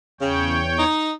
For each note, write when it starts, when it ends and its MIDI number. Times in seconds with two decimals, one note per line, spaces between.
0.21 0.84 40
0.21 0.63 49
0.21 0.84 73
0.21 0.84 79
0.79 1.12 63